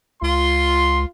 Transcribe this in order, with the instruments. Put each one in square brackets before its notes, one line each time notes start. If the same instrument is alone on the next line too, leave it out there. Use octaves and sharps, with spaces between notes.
[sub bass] C#2 [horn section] F4 C6